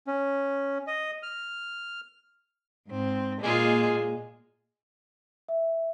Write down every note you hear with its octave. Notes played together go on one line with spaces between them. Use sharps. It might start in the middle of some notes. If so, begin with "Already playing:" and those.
C#4
D#5
F6
G#2 C4
A#2 G#3 A#3 F4 G#4
E5